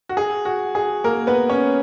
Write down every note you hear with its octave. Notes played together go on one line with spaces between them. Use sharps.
F#4
G#4
F#4
G#4
A#3 A#4
B3 B4
C#4 C#5